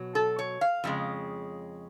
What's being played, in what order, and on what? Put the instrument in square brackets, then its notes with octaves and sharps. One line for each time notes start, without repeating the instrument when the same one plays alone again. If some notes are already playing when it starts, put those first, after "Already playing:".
Already playing: [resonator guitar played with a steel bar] B2 F#3
A4
C#5
F5
F2 C#3 G#3